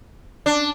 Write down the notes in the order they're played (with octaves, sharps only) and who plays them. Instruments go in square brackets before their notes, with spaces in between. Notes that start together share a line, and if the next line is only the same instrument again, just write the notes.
[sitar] D4